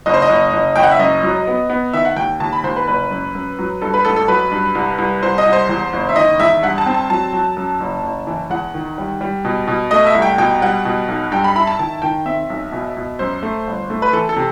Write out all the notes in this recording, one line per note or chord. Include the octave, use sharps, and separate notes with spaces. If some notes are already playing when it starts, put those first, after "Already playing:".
F#1 D#5
C5
D#5
F#1
F#1
F#1 G5
F#5
E5
F#2 D#5
F#3
B3
B3
D#3 E5
F#5
D#2 G5
D#2 A5
B5
D#2 C5
B4
F#1 B4
F#2
F#2
F#3
G2 A4
B4
A1 A4
A4
F#3 B4
G2
C2
C2
C2 C5
D#5
C2
C5
E2
F#1
E5
D#3 D#5
E2 E5
G2 F#5
A5
C4
A5
F#3 A5
F#3
F#2
F#1
F#1
E3
E2 F#5
D#3
G3
G3
B2
B2
A3 D#5
E5
C2
G5
B2 G5
G3 F#5
B2
B1
G2 G5
B5
E4 B5
A5
D#3 A5
D#3 G5
C4 E5
B1
B2
B2
F#2 C5
A3
G1
A3
B4
E3 A4
A4
C3